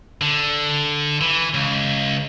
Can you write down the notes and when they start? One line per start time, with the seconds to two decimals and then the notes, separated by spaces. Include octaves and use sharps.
0.21 D3
1.21 E3
1.54 C#2